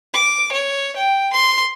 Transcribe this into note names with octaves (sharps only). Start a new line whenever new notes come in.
D6
C#5
G5
C6